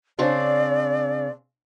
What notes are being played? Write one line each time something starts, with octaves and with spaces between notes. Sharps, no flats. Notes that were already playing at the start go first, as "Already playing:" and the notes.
C#3 C4 D4 D5